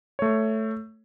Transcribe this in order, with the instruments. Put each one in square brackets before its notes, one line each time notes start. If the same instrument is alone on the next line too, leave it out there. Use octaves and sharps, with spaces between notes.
[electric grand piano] A3 C#5